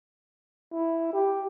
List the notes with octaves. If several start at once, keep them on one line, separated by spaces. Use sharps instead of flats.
E4
G4